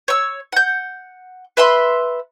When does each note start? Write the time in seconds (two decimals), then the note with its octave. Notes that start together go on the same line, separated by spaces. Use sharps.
0.08 C#5 E6
0.52 F#5 G6
1.57 B4 E5 B5 C6